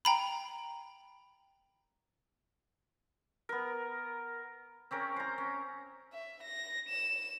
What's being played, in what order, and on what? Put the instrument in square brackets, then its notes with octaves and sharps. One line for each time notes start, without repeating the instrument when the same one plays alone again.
[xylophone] G5 A#5 B5
[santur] B3 A#4
[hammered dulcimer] C4 C#4 A#4 C#5
C5 A#5
C#4
[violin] E5
A#6
E7